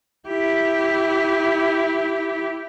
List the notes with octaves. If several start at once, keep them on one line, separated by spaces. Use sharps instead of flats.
E4 G4